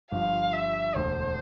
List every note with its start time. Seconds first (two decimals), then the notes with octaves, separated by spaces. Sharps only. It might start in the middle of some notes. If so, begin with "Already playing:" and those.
0.12 G1 G2 F3 F5
0.53 E5
0.95 E1 D2 D3 C5